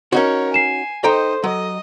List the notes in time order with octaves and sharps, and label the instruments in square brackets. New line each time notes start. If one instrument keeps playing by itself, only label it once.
[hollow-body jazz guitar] C#4 D#4 F#4 [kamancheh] A#4 C#5
[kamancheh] G#5 [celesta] C7 E7
[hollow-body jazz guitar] D#4 G5 A#5 [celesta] A4 [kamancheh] C5 D#5
[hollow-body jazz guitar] F#3 [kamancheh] D#5